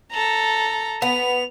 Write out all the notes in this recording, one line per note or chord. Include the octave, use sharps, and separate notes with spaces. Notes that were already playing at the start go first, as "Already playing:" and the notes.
A4 A#5
B3 F7